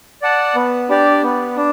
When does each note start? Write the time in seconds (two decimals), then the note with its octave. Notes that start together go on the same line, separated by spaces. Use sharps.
0.22 D5 F#5 A5
0.55 B3
0.89 D4 G4 D5
1.23 B3
1.57 D4